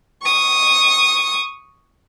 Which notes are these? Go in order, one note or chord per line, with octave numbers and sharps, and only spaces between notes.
C#6 D#6